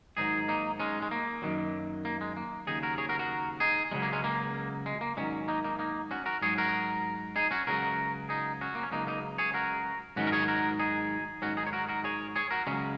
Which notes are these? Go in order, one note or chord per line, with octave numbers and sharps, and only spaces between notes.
G#2 D#3 F#3 D#4 G#4
A#3 D#4
G#3 C#4
G#3
A#3
F#2 D#3 F#3
A#3
G#3
A#3
D#2 C#3 F#3 D#4 G#4
F#4 A#4
G#4 C#5
F#4 A#4
F#4 A#4
D#4 G#4
C#2 C#3 F#3 G#3
A#3
G#3 C#4
A#3
G#3
A#3
G#2 D#3 F#3 G#3 C#4
A#3 D#4
A#3 D#4
A#3 D#4
C#4 F#4
F#4 A#4
G#2 F#3 G#4 C#5
F#4 A#4
D#4 G#4
C#4 F#4
C#2 C#3 F#3 F#4 A#4
D#4 G#4
C#4 F#4
A#3
C#4
C#2 C#3 F#3 A#3 D#4
A#3 D#4
G#4 C#5
F#4 A#4
G#2 D#3 F#3 C#4 F#4
A#4
G#4 C#5
F#4 A#4
D#4 G#4
G#2 D#3 F#3 C#4 F#4
D#4 G#4
C#5
F#4 A#4
F#4 A#4
G#4 C#5
G#4 C#5
F#4 A#4
C#2 C#3 F#3 G#3 C#4